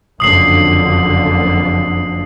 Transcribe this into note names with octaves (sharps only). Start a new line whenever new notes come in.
F#1 F2 D3 D#6 C7 F#7